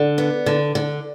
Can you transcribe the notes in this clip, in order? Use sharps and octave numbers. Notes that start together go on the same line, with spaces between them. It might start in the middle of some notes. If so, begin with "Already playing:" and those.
Already playing: D3
B3
D3
D3